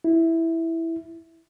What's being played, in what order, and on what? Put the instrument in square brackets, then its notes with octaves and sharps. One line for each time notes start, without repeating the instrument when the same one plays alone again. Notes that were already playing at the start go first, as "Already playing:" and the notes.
[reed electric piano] E4